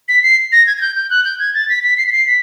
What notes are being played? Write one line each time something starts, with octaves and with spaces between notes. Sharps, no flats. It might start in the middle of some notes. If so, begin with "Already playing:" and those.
B6
C7
A#6
G#6
G#6
G6
G6
F#6
G6
G#6
A6
B6
B6
C7
B6
C7
B6